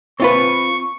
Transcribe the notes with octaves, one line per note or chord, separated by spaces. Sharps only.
C4 F4 B4 C#6